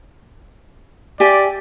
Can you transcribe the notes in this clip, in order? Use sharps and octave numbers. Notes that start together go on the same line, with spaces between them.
G4 D5 E5 G#5